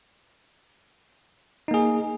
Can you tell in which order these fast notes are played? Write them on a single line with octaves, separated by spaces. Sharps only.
D#4 A#3 G#4